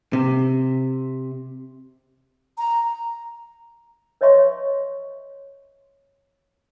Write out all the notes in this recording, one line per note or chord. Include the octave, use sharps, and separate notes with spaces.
C3
A#5
B4 C#5 D#5 E5 C6 C#6